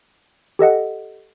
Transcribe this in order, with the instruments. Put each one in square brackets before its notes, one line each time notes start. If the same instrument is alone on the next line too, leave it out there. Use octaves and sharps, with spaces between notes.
[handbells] G4 A4 D#5 F#5